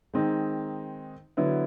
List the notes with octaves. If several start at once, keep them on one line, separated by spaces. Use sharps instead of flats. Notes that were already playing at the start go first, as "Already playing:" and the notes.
D#3 G#3 C4 D#4
D3 F#3 B3 E4